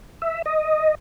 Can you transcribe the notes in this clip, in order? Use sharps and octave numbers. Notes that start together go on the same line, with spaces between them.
E5
D#5